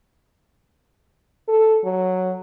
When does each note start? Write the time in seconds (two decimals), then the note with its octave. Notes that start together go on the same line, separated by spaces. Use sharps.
1.48 A4
1.84 F#3